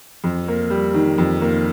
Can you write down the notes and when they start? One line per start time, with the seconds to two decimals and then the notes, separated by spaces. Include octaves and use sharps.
0.24 F2
0.48 A#3
0.70 G3
0.94 D#3
1.18 F2
1.42 A#3